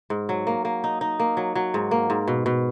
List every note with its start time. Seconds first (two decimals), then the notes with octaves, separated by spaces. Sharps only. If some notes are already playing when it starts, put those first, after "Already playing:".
0.10 G#2
0.29 F#3
0.47 A#3
0.65 A#3
0.84 D#4
1.01 D#4
1.20 A#3
1.37 F#3
1.55 F#3
1.74 G#2
1.91 A#3
2.10 G#2
2.28 B2
2.46 B2